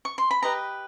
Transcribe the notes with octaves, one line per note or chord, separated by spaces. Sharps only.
C#6
C6
B5
G4 B4 D#5 A#5